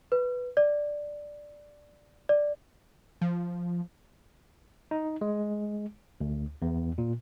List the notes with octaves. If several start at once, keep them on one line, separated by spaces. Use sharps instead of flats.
B4
D5
D5
F3
D#4
G#3
D2
E2
A#2